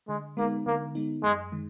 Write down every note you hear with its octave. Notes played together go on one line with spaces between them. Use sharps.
D3 G#3
G#3 A#3 B3 D#4
D3 A#3
G#3 B3 D#4
F#2 G#3
D#3 G#3